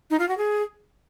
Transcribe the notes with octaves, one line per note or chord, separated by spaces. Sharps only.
D#4
F4
F#4
G#4